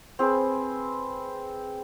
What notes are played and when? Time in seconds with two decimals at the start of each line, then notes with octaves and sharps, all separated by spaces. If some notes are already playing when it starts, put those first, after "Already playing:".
0.19 C4 G#4 B4